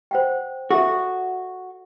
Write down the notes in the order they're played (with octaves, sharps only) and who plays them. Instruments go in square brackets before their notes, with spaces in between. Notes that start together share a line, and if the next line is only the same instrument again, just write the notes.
[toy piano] C5 F#5 G5
[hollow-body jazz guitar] F#4 [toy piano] A4 E5